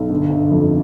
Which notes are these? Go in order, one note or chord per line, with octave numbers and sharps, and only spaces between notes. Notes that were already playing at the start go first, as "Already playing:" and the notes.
Already playing: B1
G1
G1
F2